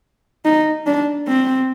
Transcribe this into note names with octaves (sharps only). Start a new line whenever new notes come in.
D#4
D4
C4